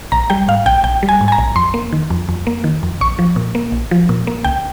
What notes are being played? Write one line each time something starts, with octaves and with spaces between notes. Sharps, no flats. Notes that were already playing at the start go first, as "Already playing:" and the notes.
A#1 A#5
G3 G5
G#2 F5
A#1 G5
A#1 G5
G3
G#5
G#2
G#5
A#5
A#1
F2 C6
A#3
D#3
F2
F2
A#3
D#3
F2
A#1 C#6
F3
A#2
A#3
A#1
F3
A#2
A#3
C#2 G5